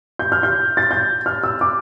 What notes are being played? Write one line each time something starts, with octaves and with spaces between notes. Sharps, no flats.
G6
F6
G6
A6
G6
F6
E6
D6